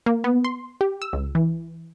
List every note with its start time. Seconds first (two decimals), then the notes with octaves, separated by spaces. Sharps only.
0.06 A#3
0.24 B3
0.45 C6
0.81 G4
1.02 E6
1.13 C#2
1.35 E3